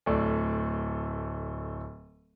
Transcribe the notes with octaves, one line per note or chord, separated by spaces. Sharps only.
D1 A3 D5